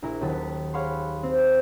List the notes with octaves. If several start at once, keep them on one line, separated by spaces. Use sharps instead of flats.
A#1 A#2 E4 A#4
D#1 D#2 F#3 A5 B6
G#4 C#5 F5 F#5 B5 C6
C4